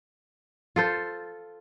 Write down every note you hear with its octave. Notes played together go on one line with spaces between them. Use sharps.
F4 A4 C5